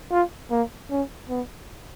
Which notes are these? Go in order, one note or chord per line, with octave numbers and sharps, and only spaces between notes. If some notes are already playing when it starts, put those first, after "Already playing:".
F4
A#3
C#4
B3